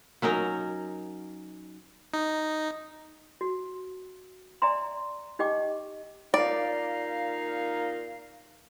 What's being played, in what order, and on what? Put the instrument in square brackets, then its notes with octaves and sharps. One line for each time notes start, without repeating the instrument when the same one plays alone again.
[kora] F#3 C#4 D#4 A#4
[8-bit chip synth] D#4
[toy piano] F#4
D5 E5 G#5 A#5 C6
D#4 G4 D#5 G5 D6
[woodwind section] A#2 D#4 F5 [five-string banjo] D5